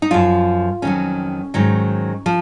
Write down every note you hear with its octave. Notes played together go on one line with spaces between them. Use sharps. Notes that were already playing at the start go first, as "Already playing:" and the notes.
D#4
F#2 F3 F4
F2 D#3 F#3 C#4
G#2 D#3 F#3
F3